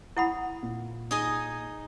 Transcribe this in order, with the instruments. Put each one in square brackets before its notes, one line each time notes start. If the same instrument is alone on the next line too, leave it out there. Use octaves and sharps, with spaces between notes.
[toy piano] E4 F#5 B5 [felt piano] D#6
[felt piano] A#2
[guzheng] D#4 G#4 D#5